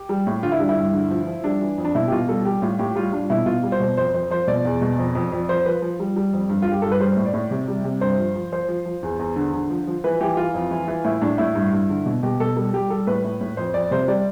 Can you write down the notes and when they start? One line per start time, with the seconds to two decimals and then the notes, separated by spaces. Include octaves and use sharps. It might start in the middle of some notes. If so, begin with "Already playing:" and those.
Already playing: G4
0.09 G3
0.27 A2
0.43 D3 F4
0.52 E4
0.60 G3 D4
0.69 E4
0.77 G2
0.94 D3
1.11 F3
1.27 F3
1.44 G3 D4
1.61 E3
1.78 F2
1.85 D4
1.95 B2 E4
2.08 G4
2.12 B2 F4
2.29 G3 A4
2.45 G3 G4
2.62 A2 F4
2.79 A2 G4
2.95 G3 F4
3.12 G3 D4
3.30 B2 E4
3.46 B2 F4
3.63 G3
3.72 C5
3.80 B2
3.97 F2 C5
4.14 F2 C5
4.30 F3 C5
4.47 B2 D5
4.65 E2
4.81 B2
4.98 F2
5.15 F2
5.32 F2
5.49 F3 C5
5.66 F3 B4
5.82 F3
6.00 G3
6.16 G3
6.33 F2
6.49 G2
6.62 F4
6.67 G2 G4
6.82 G2 A4
6.92 B4
7.00 G3 C5
7.17 A2
7.26 D5
7.34 A2
7.51 C3
7.68 G3
7.84 C3
8.01 G2 C5
8.18 F3
8.35 F3
8.52 F3 C5
8.68 F3
8.86 F3
9.03 E2
9.19 E2
9.36 D3
9.54 D3
9.70 F3
9.87 F3
10.04 E3 B4
10.21 E3 G4
10.37 E3 F4
10.54 F2
10.71 E3
10.88 E3
11.05 A2 E4
11.22 A2 D4
11.38 A2 E4
11.55 G2
11.72 G2
11.90 D3
12.06 B2
12.23 B2 G4
12.40 B2 A4
12.56 G3 A4
12.73 G3 G4
12.90 G3 A4
13.07 A2 B4
13.24 A2
13.41 A2
13.57 F2 C5
13.74 F2 D5
13.91 C3 C5
14.08 G3 D5